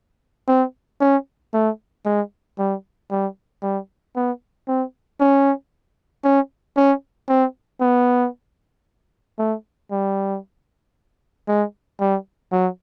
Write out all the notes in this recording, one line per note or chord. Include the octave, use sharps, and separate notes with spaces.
C4
C#4
A3
G#3
G3
G3
G3
B3
C4
C#4
C#4
C#4
C4
B3
A3
G3
G#3
G3
F#3